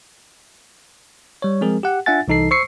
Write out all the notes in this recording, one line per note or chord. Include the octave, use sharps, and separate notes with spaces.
G3 C#5
F3 G#3 C4 G#4 A#4
G4 F#5
D4 F4 E5 F#5 G#5 A6
C2 E3 D#4 A4 C7
C5 C#6 E6 C7 C#7